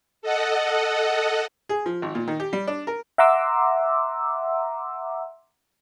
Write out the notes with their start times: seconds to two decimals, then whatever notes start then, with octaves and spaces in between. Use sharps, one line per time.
0.22 A4 D#5 F#5
1.69 G#4
1.86 F3
2.02 G#1
2.15 A#2
2.28 D#3
2.40 G4
2.53 G3
2.67 D4
2.87 A#4
3.18 E5 F#5 A#5 C6 D6 E6